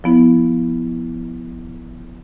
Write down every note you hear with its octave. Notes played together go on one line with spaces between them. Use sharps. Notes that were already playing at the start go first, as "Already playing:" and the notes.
F3 B3 E4